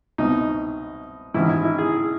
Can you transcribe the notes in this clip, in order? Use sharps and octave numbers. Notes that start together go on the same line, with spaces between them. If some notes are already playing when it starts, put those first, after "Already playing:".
C2 B2 D#4
A1 G#2 D#3 E4
E4
E4
G#4